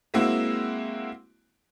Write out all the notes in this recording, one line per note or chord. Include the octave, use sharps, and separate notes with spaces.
G#3 A#3 C4 E4 F#4